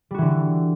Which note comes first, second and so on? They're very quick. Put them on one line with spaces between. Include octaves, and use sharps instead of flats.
G3 F#4 E3 D3